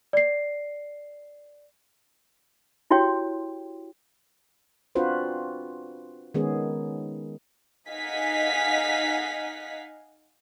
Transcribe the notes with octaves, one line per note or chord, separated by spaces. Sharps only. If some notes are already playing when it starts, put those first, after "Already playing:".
D5 C7
E4 F#4 G4 C#5 G5 C6
C4 D4 F4 F#4 B4 C5
D#3 G#3 B3 C#4 G#4
D#4 D#5 F5 F#5 G#5 B6